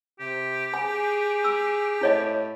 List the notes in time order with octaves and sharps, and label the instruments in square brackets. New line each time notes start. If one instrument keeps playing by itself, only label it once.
[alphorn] C3 [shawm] G4
[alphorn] G#4 [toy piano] G#5
[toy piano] E6
[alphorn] A2 [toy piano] E4 C#5 D#5